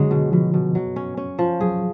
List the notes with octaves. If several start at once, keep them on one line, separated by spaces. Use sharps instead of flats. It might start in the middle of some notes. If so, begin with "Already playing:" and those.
Already playing: D3 F#3 G#3
B2
B2 F3
B2
F#3
C#4
C#4
F3
F#3 G#4